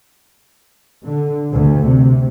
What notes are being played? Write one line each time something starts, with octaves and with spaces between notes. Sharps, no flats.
D3
D2
C3